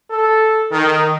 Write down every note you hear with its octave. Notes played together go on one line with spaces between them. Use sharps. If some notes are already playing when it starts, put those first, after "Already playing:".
A4
D#3